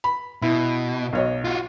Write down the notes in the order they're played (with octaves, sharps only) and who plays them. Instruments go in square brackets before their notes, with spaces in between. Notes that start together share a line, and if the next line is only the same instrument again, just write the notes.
[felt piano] B5
[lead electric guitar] B2 [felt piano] E4
[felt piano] B1 C#5 D#5
[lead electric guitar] F4 F#4